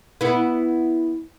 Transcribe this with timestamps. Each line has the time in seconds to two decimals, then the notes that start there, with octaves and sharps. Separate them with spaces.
0.21 B3 E4